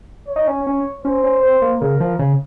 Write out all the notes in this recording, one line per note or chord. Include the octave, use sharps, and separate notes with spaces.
C#5
D#4
C#4
C#4
C#4 C5
C#4
C4
A#3
C#3 A#4
F3
C#3